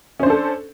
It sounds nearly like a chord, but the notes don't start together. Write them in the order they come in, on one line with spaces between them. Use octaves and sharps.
C#4 C5 D4 A4